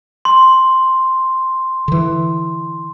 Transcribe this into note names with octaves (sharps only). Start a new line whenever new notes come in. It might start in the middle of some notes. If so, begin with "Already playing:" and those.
C6
D3 E3